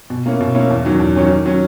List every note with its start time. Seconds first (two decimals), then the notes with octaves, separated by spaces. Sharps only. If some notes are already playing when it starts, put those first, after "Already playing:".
0.10 B2
0.26 A#3 C#4 E4
0.40 B2
0.55 A#3 C#4 E4
0.70 E2
0.85 D#3 F#3 C#4
1.00 E2
1.16 D#3 F#3 C#4
1.30 D#3
1.46 F#3 C#4